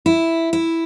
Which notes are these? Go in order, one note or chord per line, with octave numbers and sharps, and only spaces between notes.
E4
E4